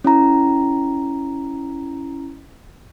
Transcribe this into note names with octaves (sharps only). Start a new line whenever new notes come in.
C#4 E4 A#5